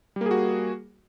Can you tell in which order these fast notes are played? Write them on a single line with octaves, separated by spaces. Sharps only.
G3 A#3 G#4 F#4